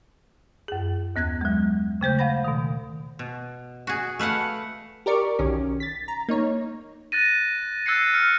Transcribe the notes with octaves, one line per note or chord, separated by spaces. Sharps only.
F#2 G#4
D#2 B3 F#6 G#6
F#3 G#3
C#3 A3 C5 G6
F5 F#5 B5 A#6
B2 D#3
B2
F#4 G#4
A3 B4 F5 F#5
G4 A#4 D5 C#6 D6
B1 D#3 C#4
A6 B6
A#5
A#3 D#4 C#5
F#6 A6 A#6 D#7
E6 F#6 G#6 A6 C7 C#7
F6 G#6 C#7